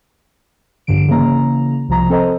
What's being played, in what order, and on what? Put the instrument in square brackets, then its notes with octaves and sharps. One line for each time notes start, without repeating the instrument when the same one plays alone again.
[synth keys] A#1 G2 D3 D7
C#3 E3 A#3 A#5
C2 C3 F3 A#5
C4 A4 C5 D#5 A#5